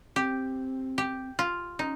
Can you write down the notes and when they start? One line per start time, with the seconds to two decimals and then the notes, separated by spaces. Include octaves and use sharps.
0.16 C4 G4
0.98 G4
1.39 F4
1.79 C#4 D#4